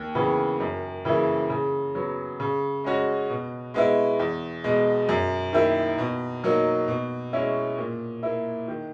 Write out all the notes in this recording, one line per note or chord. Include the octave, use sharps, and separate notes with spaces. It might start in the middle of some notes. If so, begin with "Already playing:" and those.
Already playing: D#2
C#3 E3 B3
F#2
C#3 E3 A#3 E4
C#3
F#3 B3
C#3
G#3 C#4 F#4
B2
G#3 B3 E4
E2
B2 G#3
F#2
D#3 A#3 E4
B2
F#3 A#3 D#4
B2
G#3 C#4 E4
A#2
A#3 E4
D#3